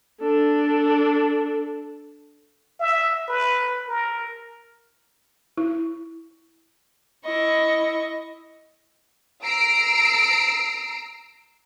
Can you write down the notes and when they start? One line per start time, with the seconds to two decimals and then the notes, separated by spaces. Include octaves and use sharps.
0.21 D4 A4
2.80 E5
3.28 B4
3.88 A#4
5.57 E4
7.26 E4 D#5 C#6
9.44 A#5 E6 C7 D7